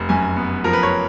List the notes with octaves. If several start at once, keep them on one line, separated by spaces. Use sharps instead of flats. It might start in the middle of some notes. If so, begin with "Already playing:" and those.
Already playing: F1
F#2 G#5
B3
F3 A#4
B4
C#5